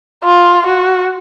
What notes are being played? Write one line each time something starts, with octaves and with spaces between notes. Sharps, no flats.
F4
F#4